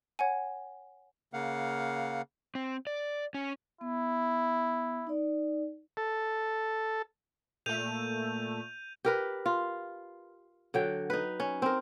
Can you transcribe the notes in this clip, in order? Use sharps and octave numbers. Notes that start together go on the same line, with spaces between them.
C#5 F#5 G#5
C#3 A#3 F5 F#5
C4
D5
C#4
B3 E4
D#4 D5
A4
A#2 A3 G6 D#7 F7
G4 A#4 B4
F4
D3 F#3 G5
D#4 B4
C#4
C4 A#4